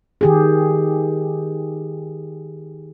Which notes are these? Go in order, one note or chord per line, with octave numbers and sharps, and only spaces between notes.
D#3 G4 G#4